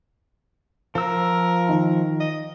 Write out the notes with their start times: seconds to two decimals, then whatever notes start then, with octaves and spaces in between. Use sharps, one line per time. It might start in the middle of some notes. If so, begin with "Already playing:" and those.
0.95 F3 A#4 E6
1.69 D#3
2.20 D#5